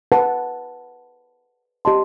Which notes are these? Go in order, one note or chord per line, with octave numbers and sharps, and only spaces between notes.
B4 F#5 A5
G4 D#5 A5 C6